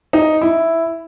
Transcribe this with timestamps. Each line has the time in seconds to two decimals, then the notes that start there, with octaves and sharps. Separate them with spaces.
0.13 D#4
0.41 E4